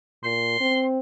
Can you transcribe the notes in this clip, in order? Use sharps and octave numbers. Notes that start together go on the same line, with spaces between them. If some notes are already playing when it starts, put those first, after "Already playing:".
A#2 C6
C4